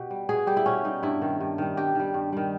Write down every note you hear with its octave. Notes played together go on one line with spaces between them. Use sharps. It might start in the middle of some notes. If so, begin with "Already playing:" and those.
Already playing: B2 G4
G3
B2 G#4
G3 G4
E4
B2 C#4
G3 D#4
G2 E4
D#3 G3
G2
D#3 G3
G2 G4
D#3 G3
G2
D#3 G3